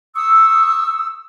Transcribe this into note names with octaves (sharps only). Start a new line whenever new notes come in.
C#6 D#6 E6